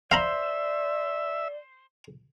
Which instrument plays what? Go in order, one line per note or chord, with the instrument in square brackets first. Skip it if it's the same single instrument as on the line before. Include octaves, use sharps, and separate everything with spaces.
[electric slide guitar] C5 [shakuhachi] D5 [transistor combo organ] E5 [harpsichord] F5 A#5 B5